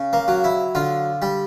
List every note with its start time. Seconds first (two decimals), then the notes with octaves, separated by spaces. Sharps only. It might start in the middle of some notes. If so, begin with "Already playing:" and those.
Already playing: C#3
0.13 A#3
0.28 F#3
0.44 E4
0.75 D3 F4
1.22 G3